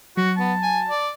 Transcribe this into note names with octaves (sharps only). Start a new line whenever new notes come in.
F#3 F#4
B3 A5
G#5
D5